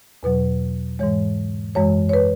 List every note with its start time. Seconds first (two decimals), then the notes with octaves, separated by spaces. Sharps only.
0.23 E2 B2 F#3 B4
0.99 G#2 E3 G#3 C#5
1.75 F#2 E3 G#3 C#5
2.09 C#5
2.13 B4